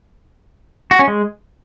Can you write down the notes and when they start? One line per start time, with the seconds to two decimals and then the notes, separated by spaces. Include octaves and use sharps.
0.91 F#4
0.99 C#4
1.08 G#3